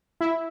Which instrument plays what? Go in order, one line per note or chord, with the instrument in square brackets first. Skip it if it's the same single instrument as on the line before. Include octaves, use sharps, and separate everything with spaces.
[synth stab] E4